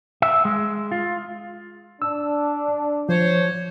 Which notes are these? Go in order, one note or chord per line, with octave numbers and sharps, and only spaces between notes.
E5
G#3
F4
D4 E6
F3 C5 C#5